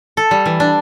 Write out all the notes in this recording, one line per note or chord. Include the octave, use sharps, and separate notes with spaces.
A4
G3
E3
D4